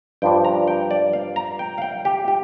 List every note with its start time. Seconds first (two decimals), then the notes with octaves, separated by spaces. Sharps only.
0.22 G2 F3 D4 G5
0.45 A#5
0.68 G5
0.91 D5
1.13 F5
1.36 A#5
1.59 G5
1.78 F5
1.82 G5
2.05 G4
2.28 G4